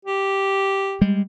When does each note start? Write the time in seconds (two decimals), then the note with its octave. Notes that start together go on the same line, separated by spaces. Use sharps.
0.05 G4
1.01 G3 G#3